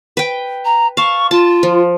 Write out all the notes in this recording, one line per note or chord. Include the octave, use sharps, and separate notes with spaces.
B4 G5
A#5
F5 A5 C#6
F4 A5
F3